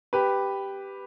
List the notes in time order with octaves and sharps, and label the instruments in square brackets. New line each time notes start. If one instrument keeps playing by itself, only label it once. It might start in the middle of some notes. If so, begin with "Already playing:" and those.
[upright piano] G4 B4